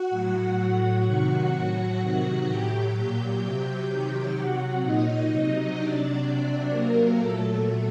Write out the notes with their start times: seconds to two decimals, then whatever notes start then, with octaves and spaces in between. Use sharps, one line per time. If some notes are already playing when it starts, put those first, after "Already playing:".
Already playing: F#4 F#5
0.10 A2 F#3
0.57 A2 F#3 F#4 F#5
1.05 C3 D#3 F#3 F#4 F#5
1.52 A2 F#3
1.99 C3 D#3 F#3
2.46 A2 F#3 G4 G5
2.94 A#2 F#3
3.40 C3 F#3 G4 G5
3.87 C3 D#3 F#3
4.34 C3 F#3 F#4 F#5
4.81 A#2 F#3 D#4 D#5
5.29 C3 F#3
5.75 C3 F#3 D4 D5
6.23 C3 F#3
6.70 C3 F#3 A#3 A#4
7.17 A#2 F#3 A3 A4